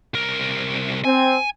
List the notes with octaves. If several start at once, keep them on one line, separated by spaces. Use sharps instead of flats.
C2 A#4
C4 G#5